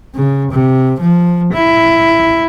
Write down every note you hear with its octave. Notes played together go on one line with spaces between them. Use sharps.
C#3
C3
F3
E4